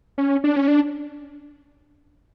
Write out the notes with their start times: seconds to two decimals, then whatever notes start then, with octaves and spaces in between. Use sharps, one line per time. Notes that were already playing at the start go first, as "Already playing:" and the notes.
0.18 C#4
0.44 D4
0.56 C#4
0.68 D4